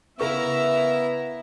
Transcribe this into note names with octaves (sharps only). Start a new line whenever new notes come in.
C#3 B3 E4 A#4 E5 A#5 C#6